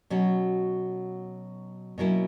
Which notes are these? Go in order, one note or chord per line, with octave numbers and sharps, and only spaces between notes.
B2 F#3 C#4 F#4
B2 F#3 A#3 C#4 E4